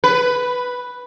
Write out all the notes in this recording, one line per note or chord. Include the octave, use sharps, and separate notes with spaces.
B4